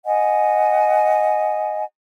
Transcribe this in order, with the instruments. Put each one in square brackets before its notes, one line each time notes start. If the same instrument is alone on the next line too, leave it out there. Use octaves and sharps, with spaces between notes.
[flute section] D#5 F#5 G#5